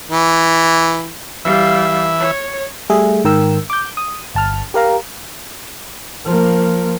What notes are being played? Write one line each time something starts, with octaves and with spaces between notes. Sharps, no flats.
E3
E3 G3 E5 F5
C#5
G3 A3 G#4 E5
G#2 D#3 A#4 G5 E6
D6 G6
D#6
G1 A5 F6
G4 A#4 F5 A#5
F3 A#3